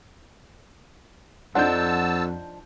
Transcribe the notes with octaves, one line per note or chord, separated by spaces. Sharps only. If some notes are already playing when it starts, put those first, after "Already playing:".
F2 F3 D4 D#4 F#5 A5 E6 G6